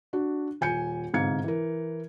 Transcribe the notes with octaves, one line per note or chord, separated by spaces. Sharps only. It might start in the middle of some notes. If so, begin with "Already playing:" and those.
D4 F#4
D#1 G#5 G6 C#7
G1 G#2 C3 F5 G#6 C#7
E3 A#4